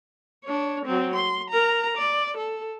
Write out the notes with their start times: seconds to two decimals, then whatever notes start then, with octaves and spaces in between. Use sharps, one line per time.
0.44 D4 C#5
0.85 F#3 C4
1.15 C6
1.50 A#4 A#5
1.97 D5
2.37 A4